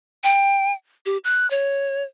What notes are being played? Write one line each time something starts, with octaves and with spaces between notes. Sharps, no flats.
G5
G4
F#6
C#5